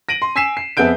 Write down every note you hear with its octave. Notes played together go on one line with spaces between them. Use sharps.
A#6 D7 D#7 F#7
C6
G#5 E6 B6 C7 E7
C7
F2 B3 G#4 E5 G6 D7